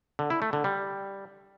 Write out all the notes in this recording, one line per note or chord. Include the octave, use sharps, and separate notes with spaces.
D3
E4
A3
D3
G3